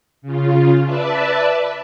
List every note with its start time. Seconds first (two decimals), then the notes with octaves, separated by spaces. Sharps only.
0.22 C#3 F4
0.85 B4 D5 E5 A5